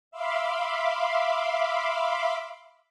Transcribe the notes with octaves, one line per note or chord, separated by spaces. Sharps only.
E5 F5 B5 C6 D6